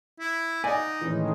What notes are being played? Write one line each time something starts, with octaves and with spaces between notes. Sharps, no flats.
E4
D#4 D5 D#5 F#5 G#5
A2 D#3 E3 G#3 C#4